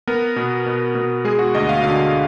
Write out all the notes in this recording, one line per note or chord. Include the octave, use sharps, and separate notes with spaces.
B3 A#4
B2
B2
B2
G#3 G#4
F#4
D2 D#5
F5
D3 F5